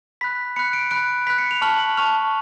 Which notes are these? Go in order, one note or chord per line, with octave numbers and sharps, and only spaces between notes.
B5 F#6 B6
B5 F#6 C#7
D7
B5 F#6 D7
B5 F#6 B6
C#7
F7
A5 C#6 F6 F#7
A5 C#6 F6 F7